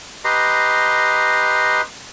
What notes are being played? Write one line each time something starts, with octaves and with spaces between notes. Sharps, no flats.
G4 B4 D#5 A#5 C6